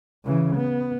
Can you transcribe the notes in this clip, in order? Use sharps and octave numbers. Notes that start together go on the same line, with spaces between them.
C#3 E3
B3